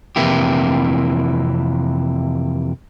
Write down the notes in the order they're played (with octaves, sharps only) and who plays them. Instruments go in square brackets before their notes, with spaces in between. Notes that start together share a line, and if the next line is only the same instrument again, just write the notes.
[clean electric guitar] F2 C3 E3 A#3 E4 G4